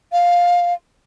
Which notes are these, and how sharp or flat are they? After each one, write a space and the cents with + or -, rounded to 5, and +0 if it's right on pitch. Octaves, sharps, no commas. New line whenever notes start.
F5 +10